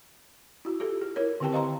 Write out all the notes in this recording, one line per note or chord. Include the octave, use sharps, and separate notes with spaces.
E4 F#4
F4 G4 A4
G#4
E4 A#4 C#5
D3 D#3 C4 G4 G5 A5
C5 D#5 F5 A#5 C6